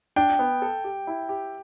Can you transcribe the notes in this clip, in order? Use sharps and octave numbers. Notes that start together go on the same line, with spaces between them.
D4 G5
B3
A4
G4
E4
G4